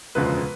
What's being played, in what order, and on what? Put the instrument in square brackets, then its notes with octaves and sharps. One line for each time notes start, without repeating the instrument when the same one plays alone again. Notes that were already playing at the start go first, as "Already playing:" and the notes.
[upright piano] E1 D2 C#3 F3 G#3 B4